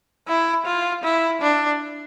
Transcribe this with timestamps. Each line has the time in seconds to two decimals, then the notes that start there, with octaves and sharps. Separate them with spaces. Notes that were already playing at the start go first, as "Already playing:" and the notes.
0.27 E4
0.66 F4
1.04 E4
1.42 D4